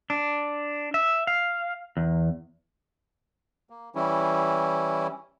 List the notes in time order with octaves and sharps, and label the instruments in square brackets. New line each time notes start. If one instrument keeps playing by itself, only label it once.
[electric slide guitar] D4
E5
F5
E2
[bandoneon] A#3
E3 G3 C#4 E4